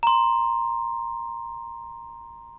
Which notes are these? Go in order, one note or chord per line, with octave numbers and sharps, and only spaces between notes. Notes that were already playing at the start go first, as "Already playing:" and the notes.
A#5 C6